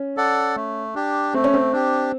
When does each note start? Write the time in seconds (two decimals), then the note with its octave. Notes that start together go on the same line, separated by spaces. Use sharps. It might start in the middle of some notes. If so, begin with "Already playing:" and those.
Already playing: C#4
0.17 A4 D5 F#5
0.56 A3
0.95 D4 G4
1.34 A3 C4
1.44 C#4
1.54 C4
1.73 D4 G4